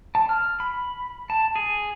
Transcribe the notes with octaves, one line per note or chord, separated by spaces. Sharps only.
A5
F6
B5
A5
G#4